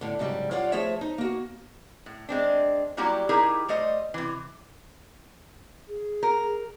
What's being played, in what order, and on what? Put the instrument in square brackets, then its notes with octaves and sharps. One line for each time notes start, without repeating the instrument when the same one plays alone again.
[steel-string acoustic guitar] A2 D3
G#2 C#3 F#3 G3
G2 F4 C#5 D5 F#5
F3 A3 G#4 C5 C#5 E5
D#4
A#3 F#4
[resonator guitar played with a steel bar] A2
G#3 C4 D4
F#3 G3 A#3 E4 F#4 G4
D#4 E4 G4 G#4 A#4
G3 A3 C5 D#5
C3 E3
[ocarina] G#4
[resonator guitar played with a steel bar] A#4